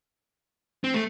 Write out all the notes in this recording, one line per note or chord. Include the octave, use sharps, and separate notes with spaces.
C4
A3